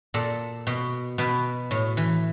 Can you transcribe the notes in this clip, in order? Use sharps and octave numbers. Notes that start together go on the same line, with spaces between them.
A#2 A4
B2
B2 B4
A2
E3